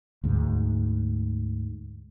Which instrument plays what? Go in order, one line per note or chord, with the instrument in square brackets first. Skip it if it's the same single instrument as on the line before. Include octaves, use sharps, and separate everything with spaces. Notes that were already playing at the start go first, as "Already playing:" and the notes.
[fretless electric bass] D2 G#2